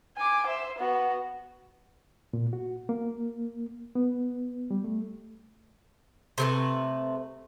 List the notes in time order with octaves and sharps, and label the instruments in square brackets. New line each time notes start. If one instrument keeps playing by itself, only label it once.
[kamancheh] G#5 D6
C5 E5
B3 F#4
[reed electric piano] A#2
F#4
A#3
B3
G3
A3
[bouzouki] C3 A3 B4